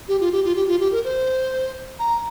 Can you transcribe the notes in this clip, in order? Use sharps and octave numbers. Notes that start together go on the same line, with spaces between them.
G4
F4
G4
F4
G4
F4
G4
A#4
C5
A#5